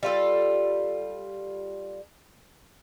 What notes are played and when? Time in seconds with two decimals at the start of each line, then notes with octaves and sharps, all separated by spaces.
0.03 G3 F4 A4